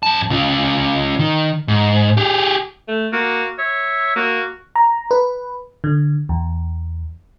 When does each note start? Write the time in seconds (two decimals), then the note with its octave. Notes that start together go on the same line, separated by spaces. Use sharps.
0.03 F#2 A5
0.30 C#3 F4
1.19 D#3
1.68 G#2
2.17 G4 G#4
2.88 A3
3.13 A#3 F#4
3.59 C#5 E5
4.16 A#3 F#4
4.76 A#5
5.11 B4
5.84 D3
6.29 E2